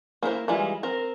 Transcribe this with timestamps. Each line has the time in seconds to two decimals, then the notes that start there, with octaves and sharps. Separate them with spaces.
0.23 A#3 E4 A#4 C5
0.48 E3 G3 G#3 E4 F4
0.83 C4 A#4